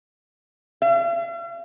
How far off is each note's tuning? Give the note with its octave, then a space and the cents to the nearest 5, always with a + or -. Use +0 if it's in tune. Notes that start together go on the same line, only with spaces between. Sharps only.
F5 -45